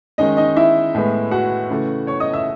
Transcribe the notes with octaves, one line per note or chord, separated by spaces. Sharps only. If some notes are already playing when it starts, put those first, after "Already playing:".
D#3 G#3 C#4 D#4 D#5
D#4 D#5
E4 E5
A2 G#3 B3
F#4 F#5
C#3 E3 A3
C#5 C#6
D#5 D#6
E5 E6